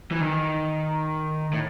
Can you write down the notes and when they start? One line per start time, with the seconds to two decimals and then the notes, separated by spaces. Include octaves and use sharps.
0.11 E3
0.20 D#3
1.53 A2